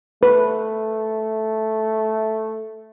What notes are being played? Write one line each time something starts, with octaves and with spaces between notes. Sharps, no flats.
A3 B4